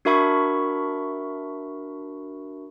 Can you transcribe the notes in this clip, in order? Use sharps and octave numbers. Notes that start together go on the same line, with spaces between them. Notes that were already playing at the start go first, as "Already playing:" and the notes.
D4 F#4 A#4 E5 B5 C#6